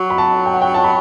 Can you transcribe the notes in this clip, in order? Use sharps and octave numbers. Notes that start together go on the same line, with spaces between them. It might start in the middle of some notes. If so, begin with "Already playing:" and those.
Already playing: F#3
B5
A5
G5
F#5
G5
A5
B5